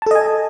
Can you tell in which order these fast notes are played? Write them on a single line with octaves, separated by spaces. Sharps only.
A5 A4 D#5 G#5